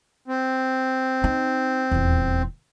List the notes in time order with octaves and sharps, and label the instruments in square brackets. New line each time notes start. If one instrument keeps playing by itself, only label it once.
[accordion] C4
[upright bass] D#4
D#1 E2